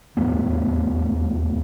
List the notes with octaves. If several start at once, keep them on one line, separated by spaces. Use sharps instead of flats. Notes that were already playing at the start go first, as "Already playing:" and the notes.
D#1 E2 A3 B3